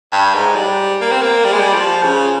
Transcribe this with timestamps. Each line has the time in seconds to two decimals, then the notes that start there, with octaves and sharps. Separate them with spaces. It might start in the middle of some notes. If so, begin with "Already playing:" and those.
0.13 G2
0.34 G#2
0.56 G3
1.01 A#3
1.12 C4
1.22 A#3
1.45 G3
1.52 G#3
1.60 G3
1.74 F3
2.03 C#3